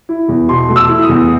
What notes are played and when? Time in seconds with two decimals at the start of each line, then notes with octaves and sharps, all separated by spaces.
0.09 E4
0.28 E2
0.48 B2 C6
0.69 A3
0.76 E6
0.89 E4
1.03 D#6
1.09 E2